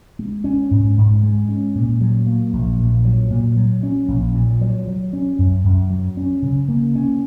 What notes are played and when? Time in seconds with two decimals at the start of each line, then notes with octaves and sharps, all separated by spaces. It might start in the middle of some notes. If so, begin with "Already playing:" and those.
0.19 G#3
0.44 C#4
0.71 G#2
0.97 G#2
1.23 G#3
1.49 C#4
1.75 A#2
2.01 F#3
2.27 A#3
2.53 A#1
2.78 A#2
3.05 F#3
3.30 A#2
3.57 F#3
3.83 C#4
4.08 A#1
4.35 A#2
4.61 F#3
4.87 F#3
5.13 C#4
5.39 F#2
5.64 F#2
5.90 F#3
6.17 C#4
6.42 C#3
6.69 A#3
6.95 C#4